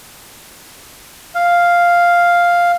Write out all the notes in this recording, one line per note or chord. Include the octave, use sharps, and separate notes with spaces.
F5